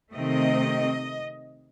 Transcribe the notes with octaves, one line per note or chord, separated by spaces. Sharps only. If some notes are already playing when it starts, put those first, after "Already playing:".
C3 D#3 A3 C4 D#5